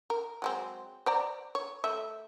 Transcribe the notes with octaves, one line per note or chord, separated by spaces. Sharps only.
A#4
F#3 G#3 C4
C5 D5 A#5
C#5
A3 E5